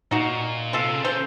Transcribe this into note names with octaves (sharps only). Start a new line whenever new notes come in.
A#2 D#4 F#4
C3 F4 A4
C#3
A4 C5